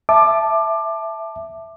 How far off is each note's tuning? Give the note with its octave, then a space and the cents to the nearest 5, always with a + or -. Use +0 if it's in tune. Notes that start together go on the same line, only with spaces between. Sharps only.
E5 +0 A5 -10 D6 +20